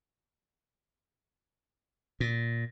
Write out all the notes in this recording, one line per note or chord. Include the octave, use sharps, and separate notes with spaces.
A#2